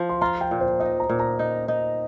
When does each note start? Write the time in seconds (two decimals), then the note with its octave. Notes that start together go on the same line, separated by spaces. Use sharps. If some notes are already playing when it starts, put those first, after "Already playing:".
Already playing: F3
0.09 C6
0.21 F4 A#5
0.41 G5
0.51 A#2
0.60 C5
0.80 D#4 D#5
1.00 A#5
1.09 A#2
1.20 A#5
1.39 D#4
1.68 D#4